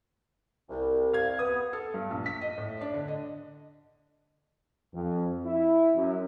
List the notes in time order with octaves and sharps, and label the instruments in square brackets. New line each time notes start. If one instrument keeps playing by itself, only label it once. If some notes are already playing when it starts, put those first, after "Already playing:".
[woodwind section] C2
[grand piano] F5 G#6
[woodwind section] B3 [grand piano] D#6
[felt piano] A4
G2
A#1
B6
D#5
A2
D4
D3
D#5
[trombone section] F2
E4
F#2